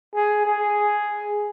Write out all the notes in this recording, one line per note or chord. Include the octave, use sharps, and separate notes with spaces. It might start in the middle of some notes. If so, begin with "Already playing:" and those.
G#4
G#4